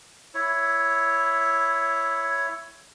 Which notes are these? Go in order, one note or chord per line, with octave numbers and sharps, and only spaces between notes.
E4 C#5